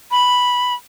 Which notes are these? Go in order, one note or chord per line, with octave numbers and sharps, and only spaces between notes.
B5